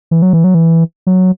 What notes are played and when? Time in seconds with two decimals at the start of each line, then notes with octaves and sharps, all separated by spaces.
0.11 E3
0.22 F#3
0.33 E3
0.44 F#3
0.54 E3
1.07 F#3